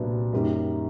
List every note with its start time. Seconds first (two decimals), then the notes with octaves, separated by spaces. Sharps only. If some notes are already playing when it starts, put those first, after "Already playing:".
Already playing: C2 A#2 F#3 B3 D4
0.33 F#2 D#3 G3 A#3